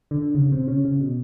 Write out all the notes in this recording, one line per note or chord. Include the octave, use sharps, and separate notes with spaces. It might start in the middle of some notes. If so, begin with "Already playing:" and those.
D3
C#3
C3
C#3
C#3
B2